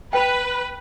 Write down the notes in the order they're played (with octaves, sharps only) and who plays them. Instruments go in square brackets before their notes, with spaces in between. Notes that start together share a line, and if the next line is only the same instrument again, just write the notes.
[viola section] B4 [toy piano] G5 B5